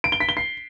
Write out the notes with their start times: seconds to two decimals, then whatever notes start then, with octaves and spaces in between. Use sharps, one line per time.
0.04 D7
0.12 G7
0.20 B6
0.29 G7
0.37 C7